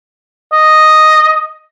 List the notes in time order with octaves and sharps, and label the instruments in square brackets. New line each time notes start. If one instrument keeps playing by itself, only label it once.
[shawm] D#5